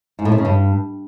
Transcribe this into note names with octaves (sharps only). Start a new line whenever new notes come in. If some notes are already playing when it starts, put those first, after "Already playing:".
G#2
A2
C3
C#3
G2